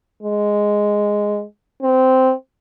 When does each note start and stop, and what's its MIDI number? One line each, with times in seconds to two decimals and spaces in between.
0.23 1.44 56
1.83 2.33 60